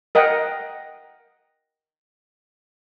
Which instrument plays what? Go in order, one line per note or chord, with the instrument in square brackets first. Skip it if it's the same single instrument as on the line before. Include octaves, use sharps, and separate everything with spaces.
[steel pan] A#4 D#5 F#5 G5